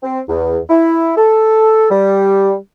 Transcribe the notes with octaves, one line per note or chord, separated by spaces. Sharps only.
C4
E2
E4
A4
G3